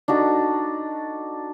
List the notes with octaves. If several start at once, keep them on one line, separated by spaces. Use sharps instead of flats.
D4 D#4 F#4 A4